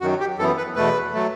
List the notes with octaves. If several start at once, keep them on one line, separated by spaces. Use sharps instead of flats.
F#2 D#3 F#3 F#4
G4
F#2 E3 B3 A4
B4
E2 B2 A3 B4
F#3 A3